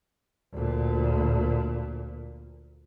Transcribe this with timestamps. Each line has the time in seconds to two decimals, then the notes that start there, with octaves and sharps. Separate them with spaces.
0.53 D2 A#2